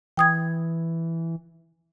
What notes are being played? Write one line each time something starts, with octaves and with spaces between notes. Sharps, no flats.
E3 G5 D#6 G#6